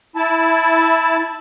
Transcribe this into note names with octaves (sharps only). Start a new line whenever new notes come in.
E4 A5